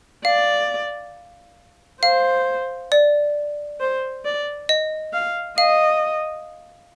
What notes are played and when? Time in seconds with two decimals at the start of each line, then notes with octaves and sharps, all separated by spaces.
0.25 D5 F5
2.03 C5 F5
2.92 D5
3.80 C5
4.25 D5
4.69 D#5
5.13 F5
5.58 D#5 F5